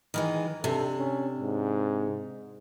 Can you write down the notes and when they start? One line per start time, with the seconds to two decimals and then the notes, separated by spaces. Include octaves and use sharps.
0.14 D#3 E3 G#3
0.64 C3 D4 A4
0.98 C#4
1.40 G#2